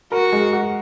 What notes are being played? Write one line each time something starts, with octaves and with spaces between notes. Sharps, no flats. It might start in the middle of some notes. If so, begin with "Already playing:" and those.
F#4 A#4
G#3
F#4